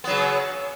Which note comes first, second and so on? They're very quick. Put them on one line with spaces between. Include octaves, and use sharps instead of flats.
B3 F#3 C#3